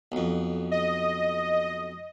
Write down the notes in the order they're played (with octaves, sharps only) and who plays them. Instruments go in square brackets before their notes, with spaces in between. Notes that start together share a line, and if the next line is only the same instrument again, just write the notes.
[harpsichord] B1 F2
[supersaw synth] D#5